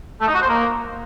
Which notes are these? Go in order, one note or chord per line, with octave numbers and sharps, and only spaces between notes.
A3
D#4
F#4
C5
A#3